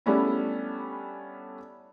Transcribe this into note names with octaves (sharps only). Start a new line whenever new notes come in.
G3 A3 B3 C#4 D4 E4